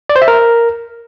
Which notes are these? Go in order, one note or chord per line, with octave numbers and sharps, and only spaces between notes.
D5
C5
E5
A#4